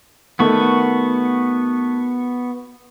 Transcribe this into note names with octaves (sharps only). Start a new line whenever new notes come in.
D#3 A3 B3 F#4 C#6